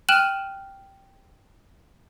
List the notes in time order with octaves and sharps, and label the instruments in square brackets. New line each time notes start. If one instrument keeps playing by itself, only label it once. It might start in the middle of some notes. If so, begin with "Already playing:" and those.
[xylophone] G5 F6 F#6 D#7 E7 F#7